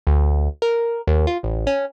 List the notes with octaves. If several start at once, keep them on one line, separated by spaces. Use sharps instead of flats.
D2
A#4
D#2
F4
A1
C#4